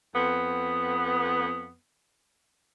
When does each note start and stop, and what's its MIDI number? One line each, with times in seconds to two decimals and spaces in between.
0.16 1.74 41
0.16 1.74 59